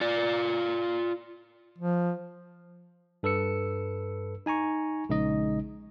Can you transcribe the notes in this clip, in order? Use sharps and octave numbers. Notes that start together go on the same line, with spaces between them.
F4 D5
F3
G2 A4 B4 E6 C#7
D#4 G#5 A#5 C#6
A#1 C#3 G#3 D#4 D#5